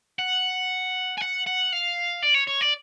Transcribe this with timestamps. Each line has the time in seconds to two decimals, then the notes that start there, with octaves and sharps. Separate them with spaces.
0.19 F#5
1.17 G#5
1.21 F#5
1.46 F#5
1.72 F5
2.23 D5
2.35 C#5
2.48 C#5
2.61 D5